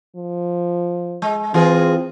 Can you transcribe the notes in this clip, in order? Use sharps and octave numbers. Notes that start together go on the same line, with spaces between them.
F3
G#3
E3 C4 F4 G#4